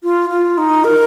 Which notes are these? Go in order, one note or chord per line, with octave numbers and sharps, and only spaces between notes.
F4
F4
D#4
A#4